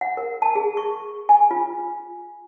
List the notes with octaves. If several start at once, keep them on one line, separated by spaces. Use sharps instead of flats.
F#5
A#4
A5
G#4
C#6
G#5
F4